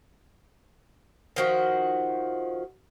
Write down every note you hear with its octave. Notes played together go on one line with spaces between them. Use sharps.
D#3 F3 F#4